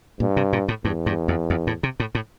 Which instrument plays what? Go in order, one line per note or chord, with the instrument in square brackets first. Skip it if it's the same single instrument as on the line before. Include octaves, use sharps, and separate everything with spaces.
[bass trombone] G2 [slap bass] A#2
[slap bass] C3
A#2
A2
[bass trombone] E2 [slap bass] G2
[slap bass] G2
F2
F2
A2
C3
A2
A2